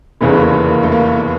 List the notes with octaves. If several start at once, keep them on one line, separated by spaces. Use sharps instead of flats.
F1 E2 C#3 E3 A3
A3
A#3
B3
A#3
A3
A#3
B3